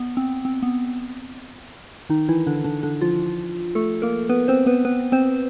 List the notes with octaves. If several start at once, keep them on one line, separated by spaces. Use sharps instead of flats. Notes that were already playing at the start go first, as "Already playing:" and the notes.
Already playing: B3
C4
C4
B3
D#3 D#4
E3 E4
D3 D4
D3 D4
D3 D4
F3 F4
A3 A4
A#3 A#4
B3 B4
C4 C5
B3 B4
B3 B4
C4 C5